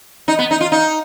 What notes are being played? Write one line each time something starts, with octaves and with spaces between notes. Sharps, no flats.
D#4
B3
D#4
F4
D#4